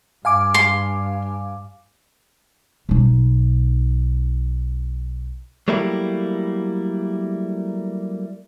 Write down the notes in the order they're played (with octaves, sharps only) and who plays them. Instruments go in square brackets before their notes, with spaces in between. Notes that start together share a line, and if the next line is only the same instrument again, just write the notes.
[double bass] G2 [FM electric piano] F5 G#5 D6
[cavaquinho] C6
[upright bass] B1 D#4
[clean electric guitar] F#3 G3 A3 A#3 E4 G4